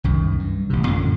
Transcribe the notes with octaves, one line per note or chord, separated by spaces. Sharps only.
C2 F#2 D#3
G2
A1 C3
F#2 A#2 D3 C#4